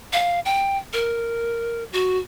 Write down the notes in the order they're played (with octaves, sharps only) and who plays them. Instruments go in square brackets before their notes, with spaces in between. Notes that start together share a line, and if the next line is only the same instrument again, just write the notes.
[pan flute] F5
G5
A#4
F#4